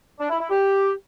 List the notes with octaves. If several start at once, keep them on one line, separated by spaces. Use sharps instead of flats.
D4
E4
E4
G4